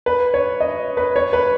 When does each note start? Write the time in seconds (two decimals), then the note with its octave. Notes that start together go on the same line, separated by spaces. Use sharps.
0.06 B4
0.34 C#5
0.60 D#5
0.97 B4
1.16 C#5
1.33 B4